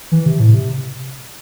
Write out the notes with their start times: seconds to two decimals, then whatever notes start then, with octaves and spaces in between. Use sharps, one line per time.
0.12 E3
0.26 C3
0.40 A2
0.54 C3